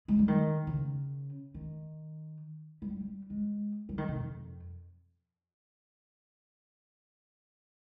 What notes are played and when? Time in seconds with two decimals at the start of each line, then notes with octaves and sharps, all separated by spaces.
0.08 G#3
0.19 G3
0.28 D#3
0.67 C#3
1.54 D#3
2.82 G3
3.00 G3
3.30 G#3
3.89 G3
3.98 D#3
4.08 C3
4.18 F2